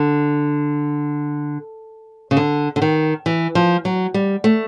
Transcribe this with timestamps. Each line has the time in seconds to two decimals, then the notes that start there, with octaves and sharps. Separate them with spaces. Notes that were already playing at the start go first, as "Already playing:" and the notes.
Already playing: D3
2.31 C#3
2.37 D3
2.76 D3
2.82 D#3
3.26 E3
3.55 F3
3.85 F#3
4.14 G3
4.44 A3